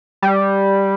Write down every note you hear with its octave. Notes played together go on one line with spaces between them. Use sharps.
G3